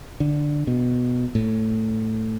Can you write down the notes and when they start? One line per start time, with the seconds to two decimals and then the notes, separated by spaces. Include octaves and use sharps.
0.20 D3
0.67 B2
1.35 A2